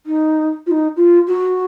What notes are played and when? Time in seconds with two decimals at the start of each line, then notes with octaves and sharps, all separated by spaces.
0.06 D#4
0.67 F4
0.71 D#4
0.97 F4
1.27 F#4